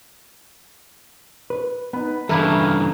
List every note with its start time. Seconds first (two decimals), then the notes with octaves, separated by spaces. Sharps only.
1.50 B4
1.93 B3 D#4 B4
2.29 G2 C#3 E3 E4 A4 A#4 F5